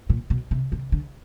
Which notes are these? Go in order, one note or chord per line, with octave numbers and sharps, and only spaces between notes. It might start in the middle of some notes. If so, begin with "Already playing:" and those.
A#2
B2
C3
C3
D3